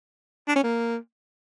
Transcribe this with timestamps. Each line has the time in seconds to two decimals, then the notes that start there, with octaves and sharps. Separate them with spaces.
0.48 D4
0.56 C#4
0.64 A#3